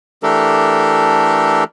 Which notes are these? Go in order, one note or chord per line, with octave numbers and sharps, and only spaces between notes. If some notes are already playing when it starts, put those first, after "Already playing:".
E3 A3 D4 G4 A4 A#4